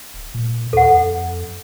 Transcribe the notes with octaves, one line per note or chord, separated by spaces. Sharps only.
D1
A#2
D#2 A4 F#5
F2